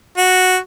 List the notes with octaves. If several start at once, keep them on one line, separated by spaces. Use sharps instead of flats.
F#4